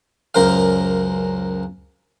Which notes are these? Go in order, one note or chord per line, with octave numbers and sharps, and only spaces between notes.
C#2 F#2 A#4 C5 F5